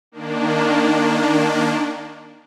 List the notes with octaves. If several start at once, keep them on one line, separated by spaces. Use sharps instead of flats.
D#3 A#3 D4